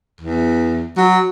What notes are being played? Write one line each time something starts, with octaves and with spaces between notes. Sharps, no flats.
E2
F#3